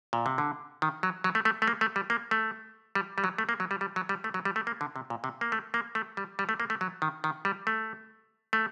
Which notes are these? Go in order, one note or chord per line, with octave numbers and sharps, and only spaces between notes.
A#2
C3
D3
D#3
F#3
F#3
A3
A3
A3
A#3
A3
G3
A#3
A3
G3
G3
F#3
A3
A#3
F#3
G3
G3
F#3
G3
A3
F#3
G3
A3
A#3
D3
C3
A#2
C3
A#3
A3
A#3
A3
G3
G3
A3
A#3
A3
F#3
D#3
D#3
G3
A3
A3